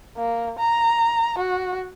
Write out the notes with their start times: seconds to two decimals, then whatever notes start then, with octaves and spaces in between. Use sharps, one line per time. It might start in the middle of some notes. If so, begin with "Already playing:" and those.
0.17 A#3
0.59 A#5
1.38 F#4